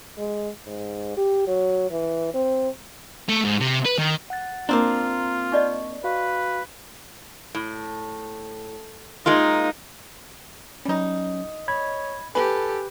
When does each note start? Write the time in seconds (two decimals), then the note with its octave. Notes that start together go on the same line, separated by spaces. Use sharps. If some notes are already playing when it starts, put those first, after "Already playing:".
0.18 G#3
0.67 G#2
1.17 G4
1.47 F#3
1.91 E3
2.34 C4
3.29 A3
3.44 G#2
3.60 C3
3.85 B4
3.98 D#3
4.30 F#5 F#6 A6
4.69 A#3 C4 D4 F4 A#5 C6
5.52 D#4 D5 D#5 C#6
6.04 F#4 B4 F5 C#6
7.55 A2
9.26 G#3 A#3 D#4 F4
10.85 F#3 G3 C#4 D#4
11.68 C#5 D#5 B5 G#6
12.35 G4 A4 B4 G#5